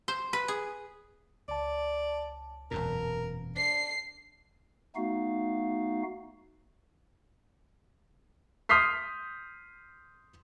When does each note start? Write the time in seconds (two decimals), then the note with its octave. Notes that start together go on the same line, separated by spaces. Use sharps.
0.08 C5
0.33 B4
0.48 G#4
1.48 C#2 D5 A5
2.71 E1 F#2 A#2 A#4
3.56 D4 C7
4.95 A3 B3 D#4 F#4 F5
8.69 C6 D#6 F6 G6 B6 C7